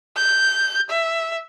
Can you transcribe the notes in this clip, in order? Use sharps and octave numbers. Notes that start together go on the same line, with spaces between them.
G6
E5